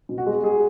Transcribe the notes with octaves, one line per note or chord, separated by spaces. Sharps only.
B2
F#4
G#3
G#3 G#4